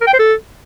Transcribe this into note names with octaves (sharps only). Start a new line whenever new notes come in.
A#4
G5
C5
A4